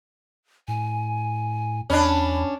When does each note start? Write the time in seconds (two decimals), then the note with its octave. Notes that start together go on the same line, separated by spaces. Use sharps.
0.68 A2 G#5
1.90 E2 C#4 D4 B5